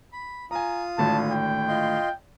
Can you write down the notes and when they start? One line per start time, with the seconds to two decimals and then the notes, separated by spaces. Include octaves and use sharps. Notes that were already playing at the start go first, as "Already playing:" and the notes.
0.13 B5
0.51 F4 G#5 A#5 D#6
0.98 G#1 A2 D3 A5
1.31 G5
1.68 F4 D#5 C6